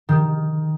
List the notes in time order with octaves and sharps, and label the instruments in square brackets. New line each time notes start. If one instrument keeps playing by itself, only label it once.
[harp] D#3